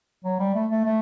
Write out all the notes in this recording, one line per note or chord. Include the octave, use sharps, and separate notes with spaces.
F#3
G3
A3
A3
A3